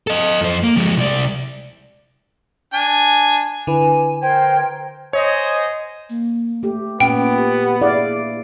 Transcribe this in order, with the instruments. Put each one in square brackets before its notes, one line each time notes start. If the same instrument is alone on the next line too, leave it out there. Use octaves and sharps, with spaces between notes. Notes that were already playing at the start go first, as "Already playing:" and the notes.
[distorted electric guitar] A4 D#5
F2 C5
A#3
F3 G#3
C2 D5
[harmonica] D4 G#5
[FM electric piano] D3 E4 B4 [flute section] G#5
[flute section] A#4 C5 G#6 [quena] G5
[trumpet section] C5 D#5 G#5 [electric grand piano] C#5
[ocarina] A#3
[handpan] A3 G4
[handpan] A#2 [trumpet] B3 [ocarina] C#4 [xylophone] G5
[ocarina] G4
[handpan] E4 D5 F5 [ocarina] G#4